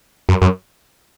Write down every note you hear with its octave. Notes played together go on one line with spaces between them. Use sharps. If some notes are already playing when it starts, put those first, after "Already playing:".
F#2
F#2